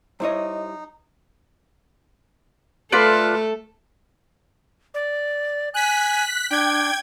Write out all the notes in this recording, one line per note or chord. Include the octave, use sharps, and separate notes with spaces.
G3 D#4 E4 C5 C#5 D#5
A3 F4 A4 B4 D5
D5
G#5 F#6 B6
D4 G5 G#6